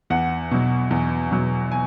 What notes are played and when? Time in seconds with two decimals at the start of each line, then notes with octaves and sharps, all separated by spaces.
0.10 E2 F#5
0.51 B2 F#3
0.91 E2
1.31 B2 F#3
1.72 G#5